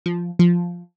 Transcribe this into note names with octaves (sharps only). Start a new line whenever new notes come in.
F3
F3